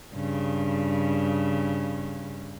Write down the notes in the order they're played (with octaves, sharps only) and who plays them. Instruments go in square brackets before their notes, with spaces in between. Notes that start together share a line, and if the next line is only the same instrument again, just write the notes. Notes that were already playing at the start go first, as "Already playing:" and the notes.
[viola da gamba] G2 C#3